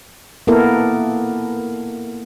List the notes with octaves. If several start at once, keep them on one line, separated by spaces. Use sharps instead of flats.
A#3 B3 E4 A4 A#4